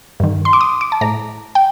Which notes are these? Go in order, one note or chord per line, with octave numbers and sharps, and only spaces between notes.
G2 D#3
C6
D6
D#6
D6
A5
A2 A#5
G5